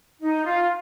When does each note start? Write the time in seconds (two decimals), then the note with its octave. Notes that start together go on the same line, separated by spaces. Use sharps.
0.22 D#4
0.45 F4